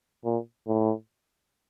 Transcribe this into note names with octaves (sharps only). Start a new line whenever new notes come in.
A#2
A2